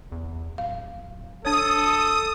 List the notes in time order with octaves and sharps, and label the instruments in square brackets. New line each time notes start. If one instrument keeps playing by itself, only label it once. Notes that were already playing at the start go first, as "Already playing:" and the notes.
[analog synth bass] E2
[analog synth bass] D1 [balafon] F5
[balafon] D4 C#5 [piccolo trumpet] A4 [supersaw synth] D#6